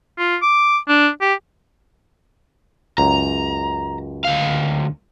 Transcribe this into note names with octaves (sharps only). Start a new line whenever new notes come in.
F4
D6
D4
G4
C#2 F#2 A#5
D2 F5